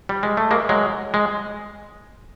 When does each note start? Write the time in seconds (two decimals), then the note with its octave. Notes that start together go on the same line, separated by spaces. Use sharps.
0.09 G3
0.23 G#3
0.37 A3
0.51 G#3 A#3
0.69 F#3 G#3
1.14 G#3